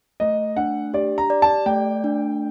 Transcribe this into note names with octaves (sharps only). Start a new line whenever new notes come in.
A3 D#5
D4 F#5
G4 D5
A#5
D5
A5
A3 G5
D4